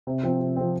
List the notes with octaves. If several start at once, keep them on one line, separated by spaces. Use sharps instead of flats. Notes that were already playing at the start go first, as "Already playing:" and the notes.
C3
F3 C4
C3
F3 C4